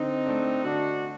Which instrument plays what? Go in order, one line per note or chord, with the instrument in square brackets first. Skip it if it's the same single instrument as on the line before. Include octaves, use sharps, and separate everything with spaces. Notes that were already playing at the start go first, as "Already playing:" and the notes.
Already playing: [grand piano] D3 [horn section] C4 D#4
[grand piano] A3 D4
[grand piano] D3 [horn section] D4 F#4